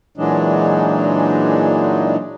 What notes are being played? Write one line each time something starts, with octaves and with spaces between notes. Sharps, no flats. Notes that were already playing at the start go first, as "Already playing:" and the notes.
A#2 E3 F#3 G#3 D4 D#4